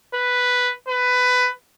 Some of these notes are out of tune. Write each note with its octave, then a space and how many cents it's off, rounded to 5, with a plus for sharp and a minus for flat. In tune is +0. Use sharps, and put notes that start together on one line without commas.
B4 +0
B4 +15